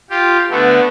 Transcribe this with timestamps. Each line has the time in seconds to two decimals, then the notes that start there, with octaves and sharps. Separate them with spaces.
0.10 F4 G4
0.50 D3 A3 B3